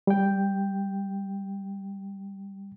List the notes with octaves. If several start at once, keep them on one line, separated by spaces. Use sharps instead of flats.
G3 G5